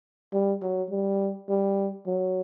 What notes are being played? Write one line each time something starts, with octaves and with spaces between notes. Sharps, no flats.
G3
F#3
G3
G3
F#3